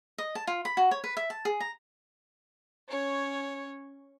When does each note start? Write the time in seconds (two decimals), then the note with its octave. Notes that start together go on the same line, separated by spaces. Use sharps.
0.18 D#5
0.35 A5
0.47 F4
0.65 B5
0.77 F#4
0.91 C#5
1.04 B4
1.17 E5
1.30 A5
1.45 G#4
1.60 A#5
2.88 C#4 C#5